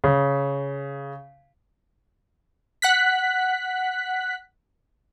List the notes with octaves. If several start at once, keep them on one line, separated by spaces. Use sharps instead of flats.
C#3
F#5 F#6 B6